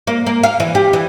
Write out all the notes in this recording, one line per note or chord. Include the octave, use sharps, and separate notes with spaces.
A#3
A#3
F5
E3
G4
E3